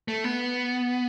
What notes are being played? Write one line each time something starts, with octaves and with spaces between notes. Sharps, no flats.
A3
B3